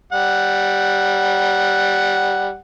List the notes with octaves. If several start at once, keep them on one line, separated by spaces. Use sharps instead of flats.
G3 F#5